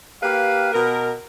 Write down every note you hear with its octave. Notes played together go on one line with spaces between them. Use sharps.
A#3 G4 B4 F5
B2 A#4